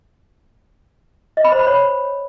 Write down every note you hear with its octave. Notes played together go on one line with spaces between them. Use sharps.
D#5
B5
C5
B5
C#5